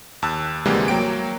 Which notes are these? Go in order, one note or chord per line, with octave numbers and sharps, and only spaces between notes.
D#2 A5 E6 F#6
D2 C3 E3 G3 G#3 A#3
F#3 A#3 G5 D7